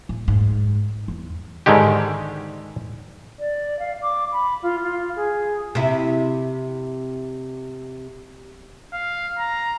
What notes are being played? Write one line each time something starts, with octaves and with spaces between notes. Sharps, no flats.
A2
G#2
E2
G#2 D3 D#3 G#3 G4
D5
F5
D6
B5
F4
F4
G#4
C3 E4
F5
A#5